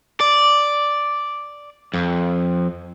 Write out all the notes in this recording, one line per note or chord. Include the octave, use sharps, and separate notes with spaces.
D5
F2